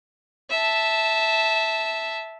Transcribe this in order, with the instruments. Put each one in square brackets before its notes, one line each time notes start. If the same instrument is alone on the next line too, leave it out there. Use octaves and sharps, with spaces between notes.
[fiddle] E5 A5